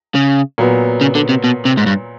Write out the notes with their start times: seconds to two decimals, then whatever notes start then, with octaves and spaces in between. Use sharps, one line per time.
0.15 C#3
0.58 A#2 F#3 B3
1.01 C#3
1.15 D3
1.29 C3
1.44 B2
1.65 C3
1.77 G#2
1.86 G2